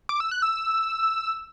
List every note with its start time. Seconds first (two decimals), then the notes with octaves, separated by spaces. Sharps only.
0.09 D6
0.20 E6
0.31 F#6
0.42 E6